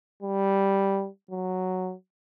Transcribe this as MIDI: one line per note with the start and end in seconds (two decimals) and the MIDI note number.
0.22 1.08 55
1.31 1.94 54